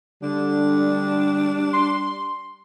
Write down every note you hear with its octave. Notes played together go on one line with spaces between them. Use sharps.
D3 G3 D4
C6